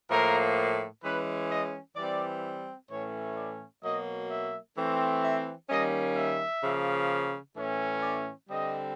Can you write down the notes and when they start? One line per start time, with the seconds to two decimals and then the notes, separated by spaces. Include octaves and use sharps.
0.09 A2 F3 A#3 A#4
1.03 E3 G#3 C#4 B4
1.49 D#5
1.96 E3 G3 C4 D5
2.89 A2 E3 A3 C#4 C#5
3.36 D5
3.82 B2 F#3 A#3 D#5
4.29 E5
4.76 E3 A3 C4
5.23 E5
5.69 D#3 G3 A#3 C#4 D#5
6.16 E5
6.62 C#3 F3 A#3
7.55 A2 E3 A3 C#4
8.02 D5
8.50 D3 G3 C4 D#5